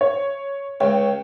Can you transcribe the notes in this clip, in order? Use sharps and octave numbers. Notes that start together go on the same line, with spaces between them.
C#5
C#2 C#5 G5